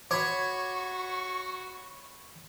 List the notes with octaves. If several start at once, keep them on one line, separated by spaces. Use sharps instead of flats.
F#4 C#5 B5 C#6 D6